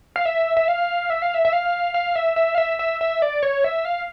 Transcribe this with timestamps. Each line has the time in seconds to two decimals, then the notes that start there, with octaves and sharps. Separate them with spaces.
0.16 F5
0.25 E5
0.57 E5
0.68 F5
1.10 E5
1.22 F5
1.34 E5
1.45 E5
1.53 F5
1.94 F5
2.16 E5
2.36 E5
2.55 F5
2.58 E5
2.79 E5
3.01 E5
3.22 D5
3.43 C#5
3.64 E5
3.85 F5